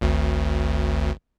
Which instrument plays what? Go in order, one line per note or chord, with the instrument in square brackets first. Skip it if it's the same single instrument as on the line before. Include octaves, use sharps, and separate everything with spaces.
[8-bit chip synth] G#1 D2